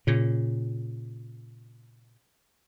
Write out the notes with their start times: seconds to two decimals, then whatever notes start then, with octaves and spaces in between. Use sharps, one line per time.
0.07 A#2 C#3